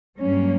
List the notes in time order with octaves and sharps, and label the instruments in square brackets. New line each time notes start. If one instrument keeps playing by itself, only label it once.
[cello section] G2 F#3 A#3 C#4